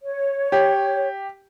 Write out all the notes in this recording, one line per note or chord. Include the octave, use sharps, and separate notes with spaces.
C#5
G4